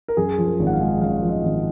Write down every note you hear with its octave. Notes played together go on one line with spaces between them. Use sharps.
A#4
F#2 G#4
F3
A#4
G#1
F#5
F5
G#3
F#2 F5
F3
D#5
G#1